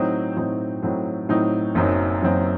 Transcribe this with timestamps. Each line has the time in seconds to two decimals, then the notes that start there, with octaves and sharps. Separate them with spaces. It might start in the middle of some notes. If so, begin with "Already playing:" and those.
Already playing: A2 F#3 C4 D#4
0.36 A2 F#3 C4 D#4
0.82 A2 F#3 C4 D#4
1.29 A2 F#3 C4 D#4
1.75 F#1 F#2 F#3 C4 D#4
2.22 F#1 F#2 F#3 C4 D#4